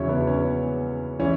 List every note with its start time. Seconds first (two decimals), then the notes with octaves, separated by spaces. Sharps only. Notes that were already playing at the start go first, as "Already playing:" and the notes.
Already playing: E2 C#3 F#3 C#4 E4 C#5
0.09 B3
0.27 C#4
1.20 E3 C#4